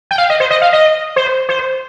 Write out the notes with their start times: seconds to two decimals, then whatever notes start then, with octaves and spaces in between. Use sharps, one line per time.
0.11 G5
0.18 F5
0.30 D#5
0.40 C5
0.51 D#5
0.62 F5
0.73 D#5
1.16 C5
1.49 C5